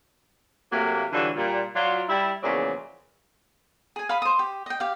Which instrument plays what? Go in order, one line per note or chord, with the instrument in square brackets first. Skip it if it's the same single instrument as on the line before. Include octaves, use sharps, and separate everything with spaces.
[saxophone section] C3 F#3 A3 A#3
D3 E3 F#3 G3 F4 A4
A#2 G3
F#3 F4 D5
G3 E4
E2 C#3 F3 F#3 A#3 D5
[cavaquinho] G#4 G#5
F5 B5 D#6
C5 D#6
G4
D#5 G5
G4 F5